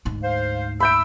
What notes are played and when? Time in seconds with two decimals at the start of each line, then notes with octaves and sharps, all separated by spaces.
0.05 D2 G#2
0.23 C5 F5
0.80 E5 B5 E6 G6 D7